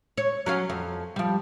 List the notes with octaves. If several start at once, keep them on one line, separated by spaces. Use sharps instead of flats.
C#5
F#3 C#4 F5
F2
F3 G3